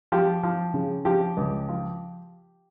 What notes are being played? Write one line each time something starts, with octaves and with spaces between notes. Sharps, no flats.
F3 G4
F3
C#3
F3 G4
C#2
F3